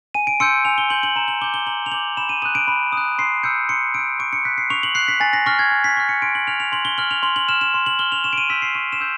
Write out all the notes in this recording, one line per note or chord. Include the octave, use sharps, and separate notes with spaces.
G#5 D#7
D7
C6 E6 G6 C#7
G#5 F7
G7
C6 E6 G6 F#7
F#7
A#5 E7
F#7
D6 G6 G7
G7
A#5 F#7
F7
D6 G6 F#7
B5 E7
D#7
D#6 F#6 D#7
D7
B5
D#6 F#6
C6 C7
E6 G6 C#7
C6 C#7
E6 G6 D7
C#6 D7
C#7
F#6 B6
C7
C#6 F7
F#7
F#6 C7
B6
G#5 A6
A#6
C#6 F6 A#6
G#6
G#5
B6
C#6 F6
C#7
C6 D7
F#7
F6 F7
F7
C6 F#7
G7
F6 F#7
F7
C6 F#7
F#7
F6 E7
E7
C6
F#7
F6 G7
F7
C#6 E7
D7
D#7
E6 G6 B6
C7
C#6 D#7
E7
E6 G6